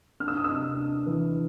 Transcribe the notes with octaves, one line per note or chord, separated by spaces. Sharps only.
D4 F6
E6
D#6
C3 E6
D4
E3